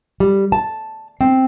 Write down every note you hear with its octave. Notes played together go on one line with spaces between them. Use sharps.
G3
A5
C4